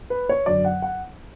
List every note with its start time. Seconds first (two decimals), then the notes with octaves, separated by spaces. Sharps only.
0.10 B4
0.29 C#5
0.46 F#2 D3 F#3 D5
0.65 F#5
0.82 F#5